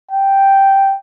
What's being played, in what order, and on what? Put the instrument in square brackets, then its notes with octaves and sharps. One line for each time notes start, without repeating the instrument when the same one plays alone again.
[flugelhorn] G5